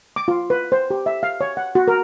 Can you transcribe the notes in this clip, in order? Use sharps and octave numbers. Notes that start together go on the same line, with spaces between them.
D6
F4
B4
C5
G4
E5
F5
C#5
F#5
F#4
A#4